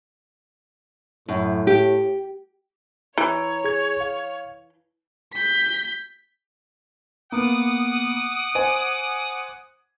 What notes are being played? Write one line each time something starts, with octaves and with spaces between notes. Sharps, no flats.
F#2 A2
G4
E3 C#5 A#5
G#4 G#6
F5
G6 B6
A#3 B3 F#5 D6 D#6
C5 G#5